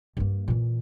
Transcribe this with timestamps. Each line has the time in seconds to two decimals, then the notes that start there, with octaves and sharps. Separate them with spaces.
0.17 G2 A#3
0.48 A#2 E3